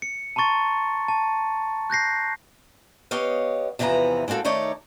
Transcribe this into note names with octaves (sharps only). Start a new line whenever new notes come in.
C#7
A5 A#5 C6 C#6 A6
A5
F#6 G6 A#6 C7
B3 G4 C#5 D#5 F5
E2 C3 E3 F3 B3 A#5
G#3 A#3 C4 F#4 A4
D#3 A3 D#4 C#5 D5 A5